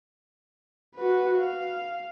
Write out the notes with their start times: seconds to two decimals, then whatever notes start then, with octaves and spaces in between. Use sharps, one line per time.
0.95 F#4 B4
1.38 F5